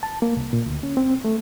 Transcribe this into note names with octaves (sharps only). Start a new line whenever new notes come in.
A5
A#3
C2
A#2
D2
C#4
C4
A3